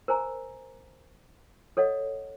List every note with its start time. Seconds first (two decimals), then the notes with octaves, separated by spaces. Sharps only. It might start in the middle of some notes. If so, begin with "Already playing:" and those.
0.08 A#4 C5 G#5 A#5
1.77 A4 C#5 D#5 F#5